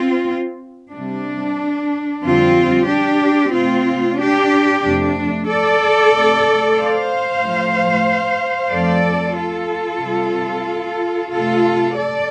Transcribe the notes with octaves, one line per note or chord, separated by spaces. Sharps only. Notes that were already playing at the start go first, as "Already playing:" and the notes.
Already playing: C4 F4
C3 G3 D4
F2 D3 G3 C4 F4
D4 G4
C3 A3 C4 F4
D4 G4
F2 C3 A3 D4
A4 D5
C3 A3
C5 F5
A2 F3 A3
F2 F3 A3 A4 D5
F4 A4
C3 G3
C3 A3 F4 A4
A4 D5